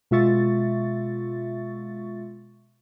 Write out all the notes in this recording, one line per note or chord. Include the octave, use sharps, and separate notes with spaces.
B2 G#3 F4 E5 C#6 A6